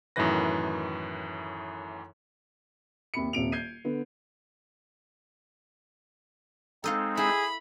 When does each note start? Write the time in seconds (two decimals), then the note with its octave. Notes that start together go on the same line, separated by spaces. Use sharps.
0.16 F#2 A2 D#3 E3 B4 A#6
3.14 D#2 C3 B5 C#7
3.33 D#1 C3 D7 F7
3.52 G6 G#6 C7 D#7
3.85 D3 B3
6.84 G#3 C4 D#4 A4 D#5 F5
7.17 E4 G#4 B5